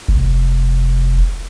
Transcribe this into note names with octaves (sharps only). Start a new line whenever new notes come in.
F1